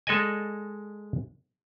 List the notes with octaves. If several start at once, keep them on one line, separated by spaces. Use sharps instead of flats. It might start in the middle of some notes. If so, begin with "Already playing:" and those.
G#3 A4 D5 D#5 G#5